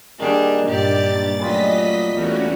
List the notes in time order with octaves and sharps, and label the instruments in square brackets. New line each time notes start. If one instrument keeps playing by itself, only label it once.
[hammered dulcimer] D#3 A#3 C#6 [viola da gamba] G3 D4 G#4
[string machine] G2 A6 [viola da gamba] A#2 G4 D5
[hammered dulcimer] C#3 G3 F4 [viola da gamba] F#3 A3 [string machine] D#5 B6
[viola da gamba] E2 A#4 [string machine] A3 C#4 F#4 [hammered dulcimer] D5 E5 D6